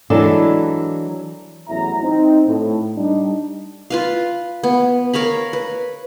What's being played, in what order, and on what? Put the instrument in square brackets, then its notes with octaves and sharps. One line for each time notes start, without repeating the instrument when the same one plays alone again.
[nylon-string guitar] E3 F#3 G#3 D4 A4 D5
[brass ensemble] A1 E2 E3 F#3 E5 A#5
C4 D#4
A2
G3 D4 D#4
[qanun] F4 B4 F5
B3
A#4 C#5 F5 B5
B4